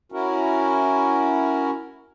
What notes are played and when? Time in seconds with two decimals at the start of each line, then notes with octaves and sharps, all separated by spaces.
0.12 C#4 E4 F#4 A#4